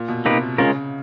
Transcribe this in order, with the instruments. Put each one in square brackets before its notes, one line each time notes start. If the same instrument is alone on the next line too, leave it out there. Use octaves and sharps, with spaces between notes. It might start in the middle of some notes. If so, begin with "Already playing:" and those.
Already playing: [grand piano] A#2
B2
[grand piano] C3 [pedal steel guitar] A#3 D#4 G4 B4
[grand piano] C#3 [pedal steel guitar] G#3 C#4 F4 A#4